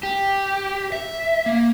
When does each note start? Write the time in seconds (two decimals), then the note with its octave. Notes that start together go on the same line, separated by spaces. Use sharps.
0.03 G4
0.92 E5
1.46 A#3